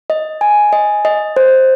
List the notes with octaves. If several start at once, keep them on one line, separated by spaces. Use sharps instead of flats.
D#5
G#5
D#5
D#5
C5